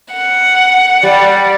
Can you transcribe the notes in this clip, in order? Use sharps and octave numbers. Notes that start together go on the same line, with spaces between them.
F#5
G3 D5